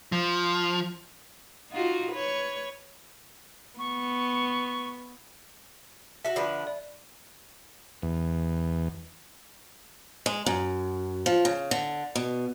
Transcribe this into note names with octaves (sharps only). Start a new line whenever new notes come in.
F3
D#4 F4 F#4
B4 C#5
B3 C#6
F#4 A4 E5
D3 F3 B4
D5
E2
G#3
F#2
F3
C#3
D3
B2